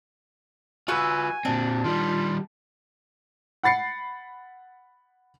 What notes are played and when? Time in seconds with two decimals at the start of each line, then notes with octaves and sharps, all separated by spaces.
0.88 F4 F#4 B4 G#5 E6
1.45 A#2 C4 D4
1.84 D#3 G3 F4
3.64 F#5 B5 A6 C7 C#7